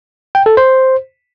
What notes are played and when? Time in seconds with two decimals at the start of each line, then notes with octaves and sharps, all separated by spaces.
0.35 G5
0.46 A4
0.57 C5